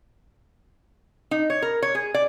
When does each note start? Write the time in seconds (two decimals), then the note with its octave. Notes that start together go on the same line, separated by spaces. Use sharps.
1.31 D#4
1.50 C#5
1.62 A#4
1.82 C#5
1.95 G#4
2.14 D5